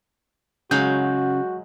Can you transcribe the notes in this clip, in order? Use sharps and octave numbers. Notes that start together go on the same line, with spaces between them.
C#3 F#3 G#3 F#4 F5 G6